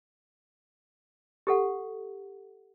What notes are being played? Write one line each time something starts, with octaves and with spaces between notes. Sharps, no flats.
G4 A4 F#5